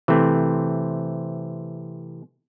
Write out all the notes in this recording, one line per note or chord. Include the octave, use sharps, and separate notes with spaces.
C3 E3 A3 C4